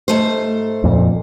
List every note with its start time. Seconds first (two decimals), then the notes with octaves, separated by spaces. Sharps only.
0.08 G#2 A3 C5
0.84 F2 A#2